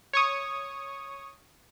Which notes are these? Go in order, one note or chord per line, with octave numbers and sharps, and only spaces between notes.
C#5 C#6 D#6